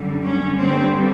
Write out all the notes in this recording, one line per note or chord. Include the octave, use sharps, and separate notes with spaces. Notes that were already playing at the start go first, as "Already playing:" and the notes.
Already playing: F#2 D3 G3
C#4
G2 D3 G3 C4